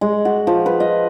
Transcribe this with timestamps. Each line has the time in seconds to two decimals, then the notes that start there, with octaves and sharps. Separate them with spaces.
0.01 G#3
0.25 F#4
0.47 F3
0.66 B4
0.80 D#5